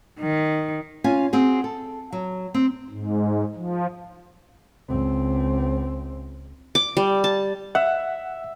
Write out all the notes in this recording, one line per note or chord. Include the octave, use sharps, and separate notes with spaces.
D#3
C#4 F4 G#5
C4 F#4 G#4
A4
F#3
C4
G#2
F3
C#2 C4
D6
G3
A5
E5 F#5